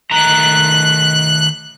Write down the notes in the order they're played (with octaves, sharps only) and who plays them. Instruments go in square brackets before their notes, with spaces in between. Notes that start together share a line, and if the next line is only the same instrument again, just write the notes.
[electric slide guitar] D#3 A3 A#5 [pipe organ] F#6